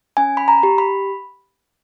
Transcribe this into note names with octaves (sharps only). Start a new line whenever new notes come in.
C#4 G#5
B5
A#5
G4
B5